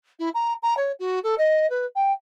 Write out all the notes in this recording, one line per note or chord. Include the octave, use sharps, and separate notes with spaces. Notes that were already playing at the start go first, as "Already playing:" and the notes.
E4
A#5
A#5
C#5
F#4
A4
D#5
B4
G5